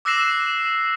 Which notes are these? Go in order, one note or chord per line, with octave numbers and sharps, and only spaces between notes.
D6 E6 F#6 A#6 C7 E7